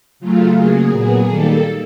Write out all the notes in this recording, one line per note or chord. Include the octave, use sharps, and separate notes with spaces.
C#3 F#3 A3 F4
C#3 F#3 A#3 G#4
A#2 F#3 B3
D#3 G3 A#3 A4